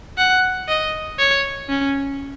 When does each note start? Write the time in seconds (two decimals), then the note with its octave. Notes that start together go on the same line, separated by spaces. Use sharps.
0.18 F#5
0.68 D#5
1.19 C#5
1.69 C#4